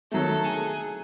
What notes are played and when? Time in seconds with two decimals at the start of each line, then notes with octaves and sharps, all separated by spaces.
0.12 D#3 F#3 A3 A4
0.44 G#4